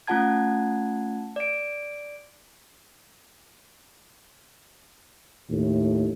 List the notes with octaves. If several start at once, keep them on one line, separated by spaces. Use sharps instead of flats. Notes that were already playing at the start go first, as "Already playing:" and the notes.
A3 C#4 F4 F#5 A5 G#6
D5 D7
D#2 A2